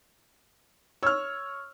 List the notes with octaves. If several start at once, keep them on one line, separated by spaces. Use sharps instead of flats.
C#5 E6 F6